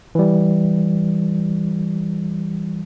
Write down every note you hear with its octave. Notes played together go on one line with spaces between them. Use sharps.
E3 G3